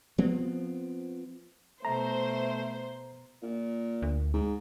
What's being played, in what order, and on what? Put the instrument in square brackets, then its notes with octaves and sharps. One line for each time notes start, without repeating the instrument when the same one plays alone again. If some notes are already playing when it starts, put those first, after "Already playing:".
[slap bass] F3 B3 C4
[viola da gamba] B2 [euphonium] A3 [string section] C5 [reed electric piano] A#5
[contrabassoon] A#2
[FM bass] D2
[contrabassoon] G#2